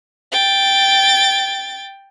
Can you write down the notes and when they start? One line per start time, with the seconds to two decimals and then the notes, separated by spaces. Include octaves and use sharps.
0.32 G5 A6